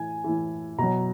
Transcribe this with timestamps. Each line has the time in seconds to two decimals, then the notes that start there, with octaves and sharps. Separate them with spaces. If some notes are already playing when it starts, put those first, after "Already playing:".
Already playing: A2 E3 G#5
0.24 A2 E3
0.78 B2 F#3 A#5